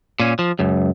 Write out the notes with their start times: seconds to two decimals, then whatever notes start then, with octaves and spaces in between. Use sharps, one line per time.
0.20 A#2 C#4
0.39 F3
0.59 C#2 F#2